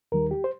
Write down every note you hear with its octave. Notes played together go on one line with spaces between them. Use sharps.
D#2 D#3 G3 A#4
G4
C5